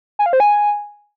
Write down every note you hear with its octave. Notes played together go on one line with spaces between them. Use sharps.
G#5
F5
C5
G#5